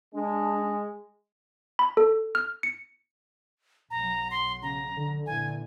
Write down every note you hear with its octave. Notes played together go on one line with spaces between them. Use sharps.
G#3 D4
B5
A4
F6
C#7
B1 F#3 A#5
C6
C#3 A#5
D3
A#2 E3 G#5